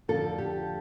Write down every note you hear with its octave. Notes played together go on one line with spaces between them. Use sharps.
F2 D3 F3 A4
G4